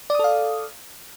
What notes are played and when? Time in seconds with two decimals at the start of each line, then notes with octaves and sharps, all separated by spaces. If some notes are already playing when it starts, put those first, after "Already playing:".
0.10 D5
0.15 D#6
0.19 A4
0.24 F5